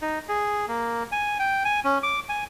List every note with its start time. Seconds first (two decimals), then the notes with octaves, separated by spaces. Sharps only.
0.02 D#4
0.29 G#4
0.68 A#3
1.12 G#5
1.39 G5
1.65 G#5
1.84 C#4
2.03 D6
2.29 G#5